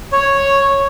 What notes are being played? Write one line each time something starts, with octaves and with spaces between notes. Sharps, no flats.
C#5